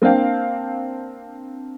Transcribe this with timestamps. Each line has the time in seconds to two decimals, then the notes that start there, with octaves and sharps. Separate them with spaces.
0.02 A#3 C4 D4 F5 G5